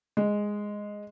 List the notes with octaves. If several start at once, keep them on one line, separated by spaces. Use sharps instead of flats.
G#3